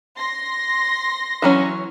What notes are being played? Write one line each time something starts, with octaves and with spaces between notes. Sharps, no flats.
C6 A#6
E3 F#3 C#4